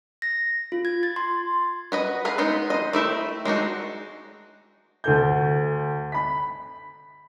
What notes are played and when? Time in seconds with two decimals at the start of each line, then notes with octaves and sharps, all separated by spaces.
0.22 A#6
0.72 F4
0.85 G#6
1.03 A6
1.16 C6
1.92 F#4 B4 D#5
2.25 G#4 B4 F5
2.38 G#3 B3 D#4
2.70 C5 D#5
2.93 A3 E4 E5 G5
3.45 G#3 D4 D#4 F#4
5.04 D2 A4 G6
6.12 B5 B6